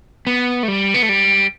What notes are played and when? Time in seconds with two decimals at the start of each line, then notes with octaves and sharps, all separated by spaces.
0.27 B3
0.63 A3
0.68 G3
0.94 B3
1.03 A3
1.09 G3